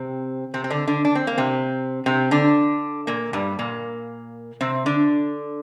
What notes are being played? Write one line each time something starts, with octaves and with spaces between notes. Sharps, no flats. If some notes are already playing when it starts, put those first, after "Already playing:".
Already playing: C3 C4
C3 C4
C4
D3 D4
D3 D4
D4
C4
A#3
C3 C4
C3 C4
D3 D4
A#2 A#3
G2 G3
A#2 A#3
C3 C4
D3 D4